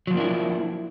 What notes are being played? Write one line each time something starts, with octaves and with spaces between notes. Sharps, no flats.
F3 F#3 A#3 D4 E4